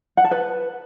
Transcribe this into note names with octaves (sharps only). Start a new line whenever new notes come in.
F#5
A5
B4